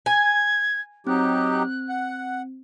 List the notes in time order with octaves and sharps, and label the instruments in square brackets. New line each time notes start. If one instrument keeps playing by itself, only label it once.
[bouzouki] G#5 [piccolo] G#6
[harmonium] F#3 D#4 G4 [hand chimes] C4 [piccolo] F#6
[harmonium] F#5